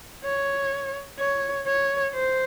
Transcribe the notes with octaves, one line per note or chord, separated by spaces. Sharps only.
C#5
C#5
C#5
C5